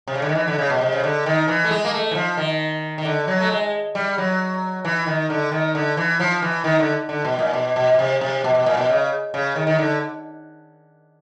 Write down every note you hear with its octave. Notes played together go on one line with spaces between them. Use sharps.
C3
C#3
D3
D#3
E3
D3
C#3
B2
C3
C#3
D3
D#3
E3
A3
G#3
A#3
A3
E3
F3
D#3
D#3
D3
F#3
A3
G#3
G3
F#3
E3
D#3
D3
D#3
D3
E3
F3
E3
D#3
D3
D3
B2
A#2
B2
B2
B2
C3
C3
B2
B2
A#2
B2
C#3
C#3
D#3
D#3
D3